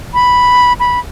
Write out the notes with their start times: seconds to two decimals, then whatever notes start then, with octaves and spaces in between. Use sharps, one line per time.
0.14 B5
0.80 B5